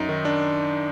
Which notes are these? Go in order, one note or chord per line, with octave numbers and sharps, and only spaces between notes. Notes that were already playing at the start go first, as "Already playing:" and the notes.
Already playing: F#2 D#4
D#3
D4